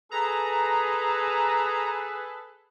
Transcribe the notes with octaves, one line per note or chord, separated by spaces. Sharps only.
G#4 A4 B4 A#5